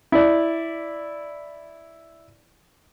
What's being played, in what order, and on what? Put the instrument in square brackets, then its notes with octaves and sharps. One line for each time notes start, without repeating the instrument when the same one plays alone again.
[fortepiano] E4 D5